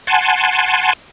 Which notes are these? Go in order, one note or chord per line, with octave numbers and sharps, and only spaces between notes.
F#5 G#5 A5 C6